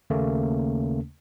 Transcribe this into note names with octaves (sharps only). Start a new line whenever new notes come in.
D#2 C#3 A3 A#3 C#4